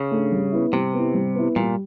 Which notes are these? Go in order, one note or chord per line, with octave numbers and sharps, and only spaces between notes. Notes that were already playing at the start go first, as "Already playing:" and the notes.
Already playing: C#3
A3 D4
G3
B3 E4
C3 G3
B3 E4
G3
B3 E4
A#2 G3